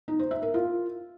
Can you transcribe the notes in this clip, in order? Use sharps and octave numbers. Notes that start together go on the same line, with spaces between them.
D#4
C5
E5
A#4
F4